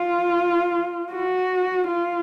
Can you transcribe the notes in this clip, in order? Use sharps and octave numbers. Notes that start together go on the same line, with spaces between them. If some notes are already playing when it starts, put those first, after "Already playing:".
Already playing: F4
F#4
F4